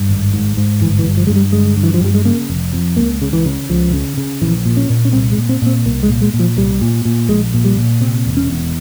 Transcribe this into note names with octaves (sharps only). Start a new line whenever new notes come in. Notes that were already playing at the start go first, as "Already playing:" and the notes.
Already playing: G2
G#1
G#2
G#2
G1 E3
E3
G2
F3
G2 G#3
G3
G1 G#3
G2
E3
F3
G2 G3
G#3
C#3 A#3
F1
F2
C#2 A#3
C#3
E3
C#3
C#2 F3
C#3
C#3
A#1 E3
A#2
C#4
A#2
C#4
C2 C4
G#3
A#2
C4
A#2 C4
C2 A#3
G#3
A#2
G#3
A#2
F3
C2 G3
A#2
A#2
A#1 G#3
A#2
G3
A#2
C3 C4
E1
C#4
E2